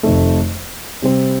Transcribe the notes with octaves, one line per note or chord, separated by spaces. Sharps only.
F1 F2 D#3 A3
C3 G3 C4